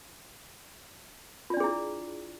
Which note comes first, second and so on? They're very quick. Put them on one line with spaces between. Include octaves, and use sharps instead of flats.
F4 D5 D4 G#4 E4